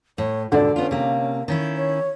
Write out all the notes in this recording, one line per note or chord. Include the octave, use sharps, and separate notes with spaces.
A2 C#5
D#2 G#2 B2 D3 A4 D5
B3 C#4 F4
C3 A#3
D#3 C#4 E4
C#5